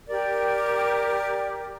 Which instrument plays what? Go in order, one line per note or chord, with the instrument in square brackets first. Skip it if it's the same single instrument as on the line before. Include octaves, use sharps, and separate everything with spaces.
[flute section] G4 A#4 [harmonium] D5